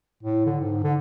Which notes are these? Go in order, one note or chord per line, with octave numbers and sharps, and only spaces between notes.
A2
D3
G#2
D3